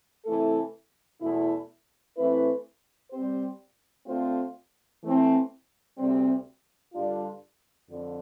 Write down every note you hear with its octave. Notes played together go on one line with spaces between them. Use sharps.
C3 E3 A3 E4 A4
E2 B2 A3 E4
E3 A3 C4 E4 B4
G3 C4 G4 C5
D3 A3 C4 F4 C5
E3 A3 C4
D2 C3 G3 C4
G2 D3 G3 D4 F4
F2 D3